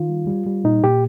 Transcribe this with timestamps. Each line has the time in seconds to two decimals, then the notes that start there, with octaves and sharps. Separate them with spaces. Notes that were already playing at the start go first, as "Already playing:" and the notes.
Already playing: D#3 F4
0.09 G3
0.27 G3
0.47 G3
0.64 A#2 D#4
0.83 A#2 G4